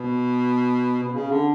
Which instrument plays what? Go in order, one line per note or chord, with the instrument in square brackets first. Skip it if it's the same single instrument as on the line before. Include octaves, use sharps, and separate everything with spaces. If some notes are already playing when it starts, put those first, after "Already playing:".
Already playing: [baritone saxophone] B2
B2
C#3
D3